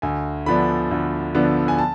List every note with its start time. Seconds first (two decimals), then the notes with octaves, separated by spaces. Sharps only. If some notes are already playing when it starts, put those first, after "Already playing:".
0.02 D2 G#5
0.46 D3 F3 B3 D4 B5
0.91 D2
1.35 D3 F3 B3 D4
1.68 G#5
1.78 A5